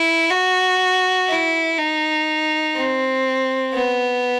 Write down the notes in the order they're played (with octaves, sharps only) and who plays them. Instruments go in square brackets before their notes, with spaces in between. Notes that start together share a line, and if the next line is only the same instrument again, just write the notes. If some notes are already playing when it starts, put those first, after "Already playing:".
Already playing: [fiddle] E4
F#4
E4
D#4
C4
B3